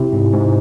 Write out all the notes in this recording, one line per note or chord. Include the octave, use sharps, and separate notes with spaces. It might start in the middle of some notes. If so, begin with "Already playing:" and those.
Already playing: C3 E4
G#2
G#2